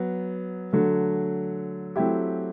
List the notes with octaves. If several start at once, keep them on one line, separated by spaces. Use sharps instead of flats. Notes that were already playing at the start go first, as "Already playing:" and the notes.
Already playing: F#3 B3
D3 F#3 A3
F#3 A3 C4 E4 G4